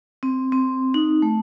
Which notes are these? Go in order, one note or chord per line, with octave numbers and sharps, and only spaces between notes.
C4
C4
D#4
A3